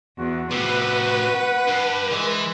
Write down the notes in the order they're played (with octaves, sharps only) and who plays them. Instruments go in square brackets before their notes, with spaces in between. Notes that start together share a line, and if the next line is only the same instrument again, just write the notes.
[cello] E2 [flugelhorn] F#4
[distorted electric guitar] A2 C3 [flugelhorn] F#4 [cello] B4
[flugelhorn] F#5
[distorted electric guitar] G2
[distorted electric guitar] E3 [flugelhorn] G#3